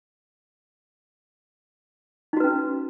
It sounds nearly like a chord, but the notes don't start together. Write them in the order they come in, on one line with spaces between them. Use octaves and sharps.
D#4 F#4 B4 C#4